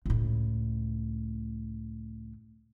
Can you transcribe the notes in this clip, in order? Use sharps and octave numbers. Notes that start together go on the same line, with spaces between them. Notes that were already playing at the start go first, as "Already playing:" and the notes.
C#2 A2